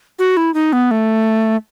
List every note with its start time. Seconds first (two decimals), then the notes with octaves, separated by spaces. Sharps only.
0.19 F#4
0.37 E4
0.54 D#4
0.73 B3
0.91 A3